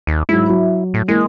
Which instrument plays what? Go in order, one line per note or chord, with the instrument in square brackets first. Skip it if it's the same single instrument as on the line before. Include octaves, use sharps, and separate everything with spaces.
[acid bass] D#2
[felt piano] G#2 F#3 [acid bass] E4
[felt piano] F#3
[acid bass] A2
[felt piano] E3 A#3 [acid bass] G#3